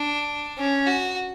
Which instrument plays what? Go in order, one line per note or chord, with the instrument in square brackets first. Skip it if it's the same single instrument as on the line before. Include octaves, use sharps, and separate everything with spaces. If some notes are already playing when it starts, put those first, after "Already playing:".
Already playing: [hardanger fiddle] D4
C#4
F#4